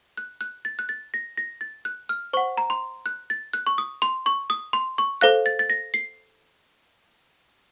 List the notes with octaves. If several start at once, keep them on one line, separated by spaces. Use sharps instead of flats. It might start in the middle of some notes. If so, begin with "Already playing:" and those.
F#6
F#6
A6
F#6
A6
A#6
A#6
A6
F#6
F6
C5 F#5 C#6
A#5
C6
F#6
A6
F#6
C#6
D#6
C6
C#6
D#6
C6
C#6
A4 C5 F5 F#6
A6
A6
A#6
C7